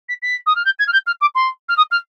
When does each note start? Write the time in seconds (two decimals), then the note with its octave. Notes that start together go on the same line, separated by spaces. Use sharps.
0.09 B6
0.22 B6
0.46 D#6
0.55 F6
0.65 G6
0.79 G#6
0.87 F6
0.93 G6
1.06 F6
1.21 D6
1.35 C6
1.68 F6
1.77 D#6
1.91 F6